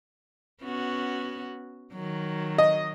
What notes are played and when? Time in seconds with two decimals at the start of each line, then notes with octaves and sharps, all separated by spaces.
0.62 B3 C#4 F#4
1.93 D#3 F#3
2.58 D#5